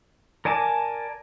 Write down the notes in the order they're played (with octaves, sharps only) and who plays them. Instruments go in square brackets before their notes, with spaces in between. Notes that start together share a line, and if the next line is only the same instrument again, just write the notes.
[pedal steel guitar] A#4 D5 G#5 A5 D6